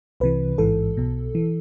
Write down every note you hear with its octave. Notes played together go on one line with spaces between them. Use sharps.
C2 C3 E3 B4
A1 G#2 E3 A4
B1 B2
E3